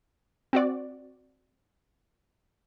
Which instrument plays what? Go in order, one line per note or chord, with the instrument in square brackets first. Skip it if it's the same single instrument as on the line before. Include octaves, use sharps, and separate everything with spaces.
[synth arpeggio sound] C4 F#4 D5